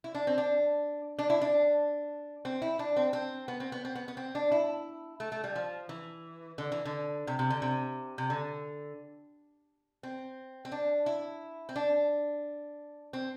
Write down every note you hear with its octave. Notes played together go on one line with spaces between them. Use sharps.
E4
D4
C4
D4
D4
E4
D4
C4
E4
D4
C4
C4
B3
C4
B3
C4
B3
B3
C4
D4
E4
A3
A3
G3
F3
E3
D3
E3
D3
C3
C3
D3
C3
C3
D3
C4
C4
D4
E4
C4
D4
C4